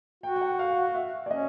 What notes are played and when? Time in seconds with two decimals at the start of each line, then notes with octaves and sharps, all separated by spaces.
0.23 F#4 G5
0.36 G5
0.41 F#5
0.59 F5
0.95 E5
1.26 D5
1.30 C#4 D#5